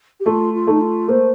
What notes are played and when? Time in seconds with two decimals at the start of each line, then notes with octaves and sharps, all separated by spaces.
0.20 G4
0.26 A3 F4
0.54 F4
0.67 A3 D#4
0.81 F4
1.08 A#3 C5